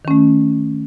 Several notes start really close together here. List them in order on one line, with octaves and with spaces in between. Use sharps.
D#3 C#4 A3